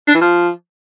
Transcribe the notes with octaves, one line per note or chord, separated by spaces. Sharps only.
D4
E3
F3